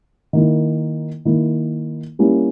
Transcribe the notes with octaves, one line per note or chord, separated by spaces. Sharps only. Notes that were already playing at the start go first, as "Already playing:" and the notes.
D#3 A#3 E4
D#3 A#3 E4
G3 A#3 C#4 E4